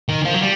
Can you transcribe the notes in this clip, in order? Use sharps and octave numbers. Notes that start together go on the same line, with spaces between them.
D#3
F3
F#3
G3